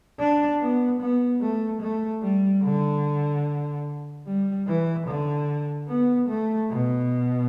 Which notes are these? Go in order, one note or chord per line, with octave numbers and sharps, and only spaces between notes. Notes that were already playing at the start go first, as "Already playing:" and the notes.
D4
B3
B3
A3
A3
G3
D3
G3
E3
D3
B3
A3
B2